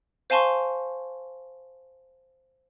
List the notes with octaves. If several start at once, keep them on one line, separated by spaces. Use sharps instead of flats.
C5 F5 G#5 A5 C6 C#6